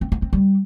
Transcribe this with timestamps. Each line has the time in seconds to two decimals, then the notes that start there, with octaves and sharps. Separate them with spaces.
0.01 C4
0.12 C#4
0.22 C4
0.33 G3